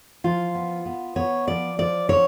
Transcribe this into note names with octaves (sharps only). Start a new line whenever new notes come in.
F3 F4
B3
B3
B3 C#5
F3 D5
F3 D5
D3 C#5